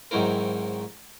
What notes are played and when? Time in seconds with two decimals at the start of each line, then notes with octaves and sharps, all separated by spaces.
0.11 G#2 D#3 F#3 C4 E4 A#4